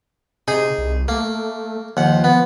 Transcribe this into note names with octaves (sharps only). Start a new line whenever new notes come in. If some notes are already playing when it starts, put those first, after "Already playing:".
C3 D#4 G#4
C2
A3 A#3
D#2 F3 F#5
B3